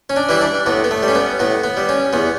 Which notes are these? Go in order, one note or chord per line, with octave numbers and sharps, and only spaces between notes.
C#4
D4
E3 G3 E4
D4
A2 B3
B3
A3
G3
C#4
B3
A2 B3
B3
G3
C#4
E2 B3